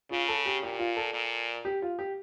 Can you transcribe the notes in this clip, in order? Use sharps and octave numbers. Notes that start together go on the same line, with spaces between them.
C#3 F4
A4
G4
A#2 G4
F4
A4
A#2
G4
F4
G4